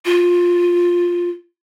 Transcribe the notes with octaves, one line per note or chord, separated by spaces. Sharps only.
F4